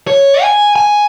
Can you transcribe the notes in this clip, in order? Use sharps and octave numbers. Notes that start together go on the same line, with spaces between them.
C#5
G#5
G#5